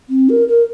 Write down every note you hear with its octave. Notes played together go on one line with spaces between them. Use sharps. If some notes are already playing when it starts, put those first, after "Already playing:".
C4
A#4
A#4